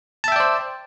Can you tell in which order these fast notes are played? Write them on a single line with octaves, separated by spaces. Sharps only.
A5 E5 G5 D5 C5